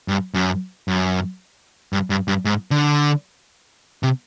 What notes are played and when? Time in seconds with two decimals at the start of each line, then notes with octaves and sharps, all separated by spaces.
0.08 G2
0.34 F#2
0.88 F#2
1.93 G2
2.10 G2
2.28 G2
2.45 G#2
2.71 D3
4.03 C3